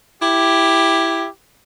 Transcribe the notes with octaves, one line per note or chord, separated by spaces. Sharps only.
E4 G4